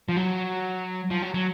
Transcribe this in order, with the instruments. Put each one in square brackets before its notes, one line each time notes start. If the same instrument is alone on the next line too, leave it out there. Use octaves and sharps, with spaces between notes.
[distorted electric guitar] F3
F#3
F3
F#3
F#3